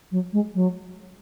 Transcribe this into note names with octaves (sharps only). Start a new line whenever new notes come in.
F#3
G#3
F#3